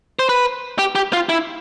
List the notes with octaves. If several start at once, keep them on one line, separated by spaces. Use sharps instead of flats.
C5
B4
G4
G4
F4
E4